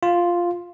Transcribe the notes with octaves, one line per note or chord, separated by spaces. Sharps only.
F4